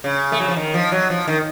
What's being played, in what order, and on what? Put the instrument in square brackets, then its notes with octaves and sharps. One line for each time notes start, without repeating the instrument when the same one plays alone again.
[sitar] C#3
A3
F#3
F3
D#3
F3
F#3
F3
D#3